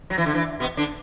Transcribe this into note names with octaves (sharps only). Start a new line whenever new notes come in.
F#3
E3
D3
E3
B2 B3
D3 D4